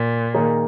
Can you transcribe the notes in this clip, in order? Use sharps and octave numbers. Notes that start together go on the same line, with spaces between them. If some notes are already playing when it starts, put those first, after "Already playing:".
Already playing: A#2
D#3 A#3 D#4 G#4